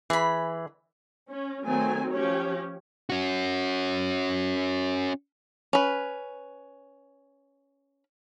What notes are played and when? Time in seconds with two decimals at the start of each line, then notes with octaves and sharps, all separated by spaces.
0.10 E3 G#4 B5
1.27 C#4
1.64 D#3 F#3 A3 C4 G#5
2.11 F3 C#4 G4 C#5
3.10 C#4 F#4
5.73 C#4 B4